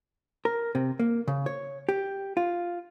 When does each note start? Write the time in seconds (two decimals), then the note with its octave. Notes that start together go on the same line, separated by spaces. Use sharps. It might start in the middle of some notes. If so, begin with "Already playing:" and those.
0.45 A#4
0.75 C3
0.99 A#3
1.28 C#3
1.46 C#5
1.89 G4
2.37 F4